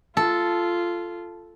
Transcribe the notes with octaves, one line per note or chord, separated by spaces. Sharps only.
F4 A4